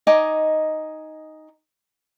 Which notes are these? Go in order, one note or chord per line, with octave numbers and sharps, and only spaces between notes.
D#4 D#5 G#5 D6